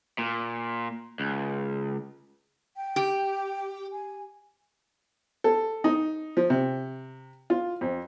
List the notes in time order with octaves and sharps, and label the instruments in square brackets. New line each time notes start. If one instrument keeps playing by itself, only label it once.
[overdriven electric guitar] A#2
C#2
[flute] G5
[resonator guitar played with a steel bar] G4
[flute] G#5
[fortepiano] A4
D#4
F3
C3
F4
F2